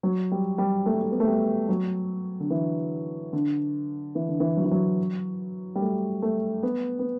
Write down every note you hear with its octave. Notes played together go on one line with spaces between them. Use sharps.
F#3
G3
G3
A3
G3
A3
B3
A3
G3
F#3
D3
E3
D3
E3
D3
E3
F#3
E3
F#3
G3
A3
A3
B3
B3